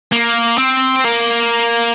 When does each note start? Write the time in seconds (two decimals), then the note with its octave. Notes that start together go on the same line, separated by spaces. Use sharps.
0.12 A#3
0.58 C4
1.05 A#3